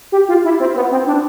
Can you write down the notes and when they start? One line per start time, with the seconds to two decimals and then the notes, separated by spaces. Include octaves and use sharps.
0.12 G4
0.29 F4
0.44 E4
0.60 C4
0.76 B3
0.91 C4
1.07 D4